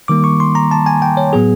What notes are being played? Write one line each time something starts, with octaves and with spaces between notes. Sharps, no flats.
D#3 G3 A#3 D6
C#6
C6
A#5
A5
G#5
G5
C#5
A2 F#3 B3 G#4